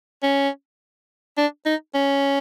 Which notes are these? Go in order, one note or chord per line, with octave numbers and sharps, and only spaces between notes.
C#4
D4
D#4
C#4